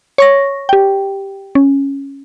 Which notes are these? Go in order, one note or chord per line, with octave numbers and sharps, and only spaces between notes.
C#5 C#6 A#6
G4 G5
C#4